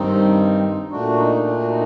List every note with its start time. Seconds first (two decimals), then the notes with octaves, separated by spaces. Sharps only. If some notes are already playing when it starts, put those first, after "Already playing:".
Already playing: G2 D#3 G3 C4 D#4
0.91 A#2 A3 D4 F#4
1.17 D#4
1.44 D4
1.61 F#4
1.69 D#4